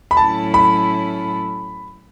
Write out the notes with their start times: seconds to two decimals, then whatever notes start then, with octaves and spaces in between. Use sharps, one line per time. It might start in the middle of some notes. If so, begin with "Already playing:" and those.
0.11 B5
0.17 A2 F#3 C#4 E4 A4 A5
0.54 B5